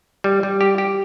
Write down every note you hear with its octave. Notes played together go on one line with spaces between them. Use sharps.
G3
G3
G4
G4